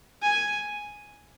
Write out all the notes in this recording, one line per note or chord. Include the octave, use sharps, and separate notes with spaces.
G#5